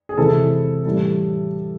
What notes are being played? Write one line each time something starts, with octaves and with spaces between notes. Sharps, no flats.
G#4
C3 E3 G#3 C4 E4 A4
A2 E3 G3 A4